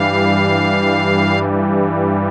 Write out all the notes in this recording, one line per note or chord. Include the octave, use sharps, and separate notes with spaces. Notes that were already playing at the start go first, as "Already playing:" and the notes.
Already playing: G2 E3 G3 F5